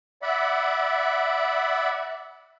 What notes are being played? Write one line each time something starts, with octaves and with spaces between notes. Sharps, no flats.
D5 E5 F#5 B5